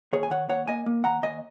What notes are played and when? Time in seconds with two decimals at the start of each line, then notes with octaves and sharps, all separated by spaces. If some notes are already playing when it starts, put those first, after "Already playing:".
0.13 D#2 G#4 C#5
0.23 G#5
0.30 D#3 C#5 F#5
0.49 D#2 C#5 F#5
0.67 A#3 D#5 G#5
0.86 A#3
1.04 D#2 F#5 A#5
1.23 D#2 D#5 G#5